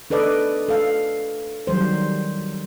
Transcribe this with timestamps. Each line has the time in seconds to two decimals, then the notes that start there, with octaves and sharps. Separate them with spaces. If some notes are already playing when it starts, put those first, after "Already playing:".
0.10 D4 A4 B4 D5 D#5
0.69 A4 F5
1.67 D#3 F#3 G3 C5